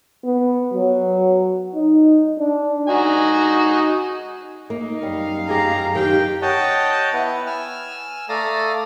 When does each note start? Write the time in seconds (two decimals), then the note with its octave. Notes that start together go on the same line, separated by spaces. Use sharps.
0.24 B3
0.74 F#3
1.74 D#4
2.39 D4
2.88 D#4 F#4 G#5
4.70 A#3 D#4
5.03 F#2 G3 F5
5.49 G4 G#4 A#5
5.95 D#3 G4 G5
6.42 C#5 D#5 F#5 G5 A5
7.13 B3 E4 B4 F#5
7.46 G#5 E6 F6
8.29 A3 A4 D5 F5 A#5 D#6